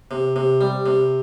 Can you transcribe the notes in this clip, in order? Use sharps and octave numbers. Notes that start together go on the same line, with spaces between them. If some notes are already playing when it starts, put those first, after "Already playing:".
C3
C3
G3
C3